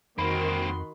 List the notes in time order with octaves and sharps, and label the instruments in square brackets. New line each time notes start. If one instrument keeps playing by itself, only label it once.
[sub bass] F2 [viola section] D#3 F#4 C6 [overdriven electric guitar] A#3 C4 [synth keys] B5